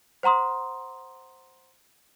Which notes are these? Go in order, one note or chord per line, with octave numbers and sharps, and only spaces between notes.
C5 F#5 A#5 C6 D#6